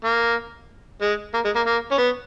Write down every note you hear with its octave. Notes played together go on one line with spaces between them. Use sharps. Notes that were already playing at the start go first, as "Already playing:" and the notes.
A#3
G#3
A#3
G#3
A#3
A#3
C#4
B3